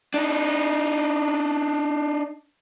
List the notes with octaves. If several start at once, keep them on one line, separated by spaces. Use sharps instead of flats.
D4 D#4